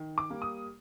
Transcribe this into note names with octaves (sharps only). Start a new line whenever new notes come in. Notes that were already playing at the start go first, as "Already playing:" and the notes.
Already playing: D#3
D6
G3 A#3
D#6